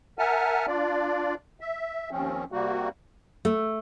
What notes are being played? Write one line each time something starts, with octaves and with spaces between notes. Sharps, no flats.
A#4 E5 F#5 G#5 A5 F6
D4 F4 D5
E5
D#2 F3 C4 C#4
C3 G3 A#3 F#4
A3